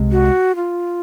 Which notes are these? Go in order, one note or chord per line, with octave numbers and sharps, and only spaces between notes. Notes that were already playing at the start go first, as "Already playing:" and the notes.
Already playing: C2 C3 G#3
F#4
F4